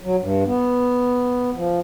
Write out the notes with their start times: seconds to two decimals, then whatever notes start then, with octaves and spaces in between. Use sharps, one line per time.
0.01 F#3
0.19 G2
0.46 B3
1.54 F3